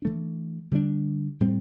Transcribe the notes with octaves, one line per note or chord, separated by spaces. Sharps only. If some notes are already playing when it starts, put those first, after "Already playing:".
E3 A3 D4
D3 G3 B3 D4
A2 G3 C4